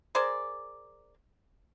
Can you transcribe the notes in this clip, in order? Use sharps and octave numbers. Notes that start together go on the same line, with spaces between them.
G#4 A#4 C5 D5